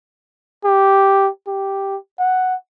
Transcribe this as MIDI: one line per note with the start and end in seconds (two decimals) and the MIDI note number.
0.65 1.29 67
1.47 1.97 67
2.19 2.55 78